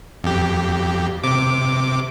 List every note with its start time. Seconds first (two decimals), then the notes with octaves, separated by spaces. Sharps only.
0.24 F2 G4
1.24 C3 D6